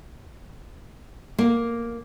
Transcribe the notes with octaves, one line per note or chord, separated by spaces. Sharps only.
A#3